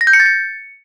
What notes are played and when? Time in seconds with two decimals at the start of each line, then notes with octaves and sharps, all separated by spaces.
0.01 A#6
0.07 G6
0.13 C#7
0.20 A6
0.26 C#7